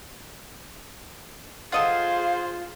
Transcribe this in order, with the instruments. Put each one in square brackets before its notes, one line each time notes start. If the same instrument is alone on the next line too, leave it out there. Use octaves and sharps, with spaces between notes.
[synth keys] F4 [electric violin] G#4 C5 [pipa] A4 D#5 F#5 [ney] F5